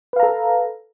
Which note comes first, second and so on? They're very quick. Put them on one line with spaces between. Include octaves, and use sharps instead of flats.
B4 F5 A#5 A4